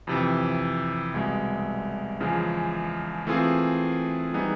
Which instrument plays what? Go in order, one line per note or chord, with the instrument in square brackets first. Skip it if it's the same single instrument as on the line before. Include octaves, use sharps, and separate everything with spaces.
[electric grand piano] F2 C3 E3
C2 B2 G#3
E2 C#3 F3 G#3
E3 A3 C4 F4 G#4
E3 G3 B3 D#4 G#4